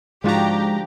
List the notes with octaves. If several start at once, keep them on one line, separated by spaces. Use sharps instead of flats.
G#2 D3 F3 G#3 F#4 G4 A#5